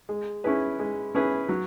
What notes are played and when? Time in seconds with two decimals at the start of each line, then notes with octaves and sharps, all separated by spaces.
0.09 G#3
0.44 C#4 E4 G#4 B4
0.79 G#3
1.15 C#4 E4 G#4 B4
1.49 F#3